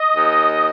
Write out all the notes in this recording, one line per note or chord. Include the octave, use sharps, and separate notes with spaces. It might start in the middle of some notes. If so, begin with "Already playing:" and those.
Already playing: D#5
D#2